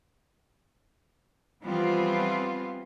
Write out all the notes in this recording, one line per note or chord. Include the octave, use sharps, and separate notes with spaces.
E3 F3 G3 B3 C4 F4